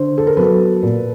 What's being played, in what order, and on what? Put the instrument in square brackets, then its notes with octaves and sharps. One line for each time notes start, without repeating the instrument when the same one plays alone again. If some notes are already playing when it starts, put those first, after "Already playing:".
Already playing: [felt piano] D3 C5
A4
A#4
F#3 B3 A4 B4
A#2